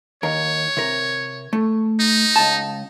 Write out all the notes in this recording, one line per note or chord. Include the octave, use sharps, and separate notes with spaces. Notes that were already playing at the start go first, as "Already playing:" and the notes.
D#2 A#4 C#5
C3 A#4
A3
D#4
C#2 A5